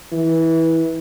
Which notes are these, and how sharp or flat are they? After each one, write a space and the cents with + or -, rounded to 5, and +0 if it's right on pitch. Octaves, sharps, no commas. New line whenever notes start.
E3 -20